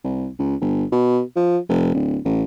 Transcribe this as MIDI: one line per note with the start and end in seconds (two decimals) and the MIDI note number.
0.04 0.29 36
0.39 0.55 37
0.61 0.84 31
0.92 1.21 47
1.36 1.58 53
1.69 1.90 29
1.94 2.18 26
2.25 2.44 33